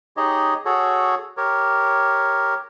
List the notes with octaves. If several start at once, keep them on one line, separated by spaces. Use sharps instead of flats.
D#4 G4 G#4 C#5 D#5
F#4 G#4 A4 C#5
G4 A#4 C#5